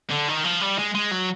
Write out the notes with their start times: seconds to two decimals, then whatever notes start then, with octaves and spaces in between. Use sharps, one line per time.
0.11 D3
0.29 D#3
0.44 F3
0.62 G3
0.78 G#3
0.94 G#3
1.11 F#3